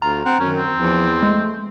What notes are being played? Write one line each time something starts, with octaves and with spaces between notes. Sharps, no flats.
D2 F4 A#5
C4 F#5
F#2 D#3 C#4
C4
E2 F3
G#3 A3